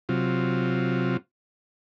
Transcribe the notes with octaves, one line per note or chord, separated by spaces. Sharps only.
C3 F#3 F4